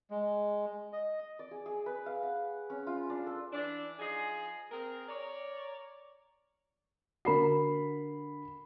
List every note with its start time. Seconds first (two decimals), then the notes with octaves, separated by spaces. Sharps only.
0.10 G#3
0.93 D#5
1.39 D5
1.51 G#4
1.66 G#4
1.86 B4
2.06 F5
2.23 F#5
2.70 C#4
2.87 F4
3.10 D4
3.27 A4
3.53 E3 D4
3.99 F3 D#4 G#4
4.72 C4 G#4 A#4
5.09 A#4 C#5 D5
7.25 D3 F#4 A#4 B5 C7